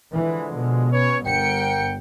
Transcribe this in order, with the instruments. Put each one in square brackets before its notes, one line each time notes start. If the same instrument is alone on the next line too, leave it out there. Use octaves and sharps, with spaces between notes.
[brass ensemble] D3 F3 G#3 [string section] E3
[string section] B2
[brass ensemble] C#4 B4 C#5
[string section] G1 C#7 [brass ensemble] A#4 F#5 G5